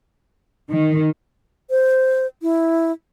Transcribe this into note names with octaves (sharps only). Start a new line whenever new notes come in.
D#3
C5
E4